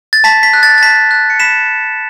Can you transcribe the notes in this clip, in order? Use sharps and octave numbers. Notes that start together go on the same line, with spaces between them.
A6
A5 B6
B6
F#6
A6
A6
A5 B6
F#6
C#7
B5 B6 E7
F#6